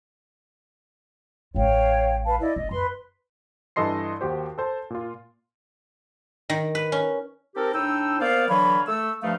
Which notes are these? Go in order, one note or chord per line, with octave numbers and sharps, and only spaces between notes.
A1 G#3 C#5 F5 G5
B4 F5 A5
E4 D5 D#5
G1 D#5
F#2 B4 C6
G2 E3 A4 D#5 C6 C7
D#2 F#4 G4 C5
A4 C5 A5
A#2 F4
D#3
B4
C#4
C4 D#4 G4 A4 A#4
A2 D4 D#4 G5 E6
A#3 B3 C5 D5 F5
D3 E3 F#3 C#5 F5 B5
A3 E6
G2 F3 A3 D#4 F5